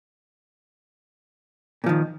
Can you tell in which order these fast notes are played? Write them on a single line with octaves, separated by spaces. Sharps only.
A#2 F3 D#3